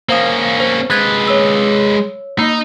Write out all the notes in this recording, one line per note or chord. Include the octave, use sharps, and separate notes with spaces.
A#3 C#4 C5 F5 D#6
C5
G#3 B4 F#6 G#6 A6
C#5 E6
A#3 D#4